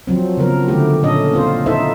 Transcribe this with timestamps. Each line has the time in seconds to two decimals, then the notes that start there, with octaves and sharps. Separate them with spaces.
0.07 F3 F#3 C4
0.37 C#3 F3 B3 A#4
0.68 D3 A3 E4 G4
1.03 A#2 C#4 D4 A4 D#5
1.33 C4 F4 C5
1.66 D#4 E4 A4 C5 E5